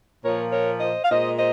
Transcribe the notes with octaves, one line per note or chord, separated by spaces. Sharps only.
A#2 F3 A#3 A#4 C#5
A#4 C#5
C5 D#5
F5
A#2 G#3 C5 D#5
C5 D#5